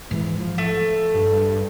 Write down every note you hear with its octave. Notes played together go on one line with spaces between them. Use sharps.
G#2 E3
F3
A3
G2